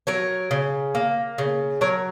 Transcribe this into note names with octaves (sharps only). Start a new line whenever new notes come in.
F#3 A#4 C#5
C#3
A#3
C#3
F#3 A#4 C#5